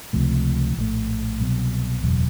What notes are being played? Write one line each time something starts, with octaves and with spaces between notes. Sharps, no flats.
C#2 C3 F3 A3
A#1 A2 F3 A3
C2 B2 F#3 B3
F#1 E2 B2 F#3